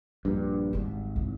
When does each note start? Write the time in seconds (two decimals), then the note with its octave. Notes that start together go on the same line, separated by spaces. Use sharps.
0.25 A#1 G2
0.73 G#1 G3 C4
1.16 C2